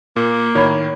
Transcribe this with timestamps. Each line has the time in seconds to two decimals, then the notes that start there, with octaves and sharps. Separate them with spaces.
0.16 A#2 A#3
0.55 A2 D#3 C#5 B5